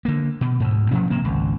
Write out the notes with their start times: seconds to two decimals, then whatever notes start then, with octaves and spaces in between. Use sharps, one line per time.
0.05 D3 A#3
0.41 B2
0.60 D2 G#2
0.91 B2 F3 F#3 C#4
1.10 C3 A#3 C4
1.25 G#1 C#2